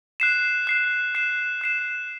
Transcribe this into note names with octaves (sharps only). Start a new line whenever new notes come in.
F#6 C7 E7
F#6 C7 E7
F#6 C7 E7
F#6 C7 E7